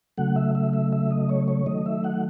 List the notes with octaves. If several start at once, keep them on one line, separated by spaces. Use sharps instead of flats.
C#3 F#3 A3 F#5
E5
E5
E5
E5
D#5
C#5
C#5
D#3 F#3 A3 D#5
E5
F#5